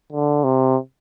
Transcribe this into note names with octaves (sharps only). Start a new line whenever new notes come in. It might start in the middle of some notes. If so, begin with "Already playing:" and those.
D3
C3